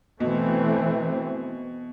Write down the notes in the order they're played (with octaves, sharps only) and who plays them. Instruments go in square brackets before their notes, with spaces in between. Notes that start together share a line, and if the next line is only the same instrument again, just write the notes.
[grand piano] B2 [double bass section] E3 A3 C4